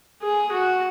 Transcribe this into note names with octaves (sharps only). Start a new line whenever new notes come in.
G#4
F#4